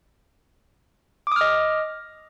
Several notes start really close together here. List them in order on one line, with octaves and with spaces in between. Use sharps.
D6 D#6 F6 D#5